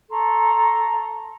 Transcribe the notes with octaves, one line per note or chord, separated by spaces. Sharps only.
A4 A#5 C6 C#6